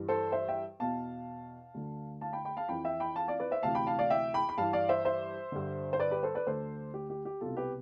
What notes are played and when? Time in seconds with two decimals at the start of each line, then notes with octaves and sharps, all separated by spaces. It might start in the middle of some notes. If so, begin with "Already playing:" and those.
Already playing: G2 E3
0.08 A4 C5
0.32 C5 E5
0.48 E5 G5
0.79 E2 B2 F5 A5
1.74 D2 D3
2.21 F5 A5
2.33 G5 B5
2.45 G5 B5
2.57 F5 A5
2.68 F2 E3 G5 B5
2.84 E5 G5
3.00 G5 B5
3.16 F5 A5
3.28 D5 F5
3.40 B4 D5
3.51 C5 E5
3.63 D2 C3 E3 F5 A5
3.75 G5 B5
3.87 F5 A5
3.99 D5 F5
4.10 E5 G5
4.34 G5 B5
4.49 B5
4.58 G2 E3 F5 A5
4.73 D5 F5
4.89 C5 E5
5.05 C5 E5
5.52 G2 D3
5.93 C5
5.99 B4 D5
6.11 G4 B4
6.23 A4 C5
6.35 B4 D5
6.47 D2 D3 A4 C5
6.94 G4
7.10 G4
7.25 G4
7.41 C2 B2 F4 A4
7.57 G4 B4